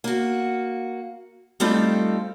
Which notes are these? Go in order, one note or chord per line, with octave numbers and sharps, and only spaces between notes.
A#3 F#4
G3 A3 C4 D#4 F4 A4